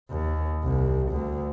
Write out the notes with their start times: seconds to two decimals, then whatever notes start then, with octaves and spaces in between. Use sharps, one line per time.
0.11 D#2
0.64 C2
1.12 D2